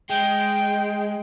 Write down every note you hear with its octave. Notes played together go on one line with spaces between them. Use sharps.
G#3 G5